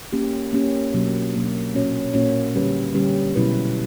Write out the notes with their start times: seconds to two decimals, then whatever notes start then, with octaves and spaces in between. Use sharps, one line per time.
0.13 A#3 C#4 G4
0.53 A#3 C#4 G4
0.94 B2 F#3 A#3 D4
1.33 B2 F#3 A#3 D4
1.74 A#2 A#3 C#4 F#4 C#5
2.14 A#2 A#3 C#4 F#4 C#5
2.54 D3 G3 C#4 G4 B4
2.94 D3 G3 C#4 G4 B4
3.35 B2 F#3 C#4 E4 B4